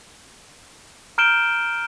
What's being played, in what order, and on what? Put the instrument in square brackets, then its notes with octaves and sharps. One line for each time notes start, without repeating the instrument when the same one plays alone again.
[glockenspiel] A#5 F6 G6 D7 E7 G7